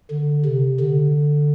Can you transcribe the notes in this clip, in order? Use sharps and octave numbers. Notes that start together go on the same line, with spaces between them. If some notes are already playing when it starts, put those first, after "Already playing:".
D3
C3
D3